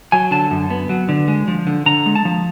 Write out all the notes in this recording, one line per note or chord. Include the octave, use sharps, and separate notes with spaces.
F#3 G#5
D3 A5
F#2
B3
F#3
D3
G#3
F3
D3
D3 A#5
G#3
A5
F3